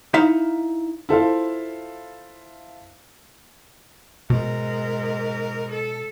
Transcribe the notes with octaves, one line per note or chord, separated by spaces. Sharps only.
D#4 E4 E5 F5
E4 F4 A4 C5 E5 F5
G#2 B2 A#4
A4